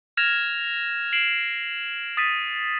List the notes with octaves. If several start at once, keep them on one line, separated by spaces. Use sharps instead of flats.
F6 G#6 A#6 E7 F7
C7 D7 E7 F#7
D#6 A6 B6 D#7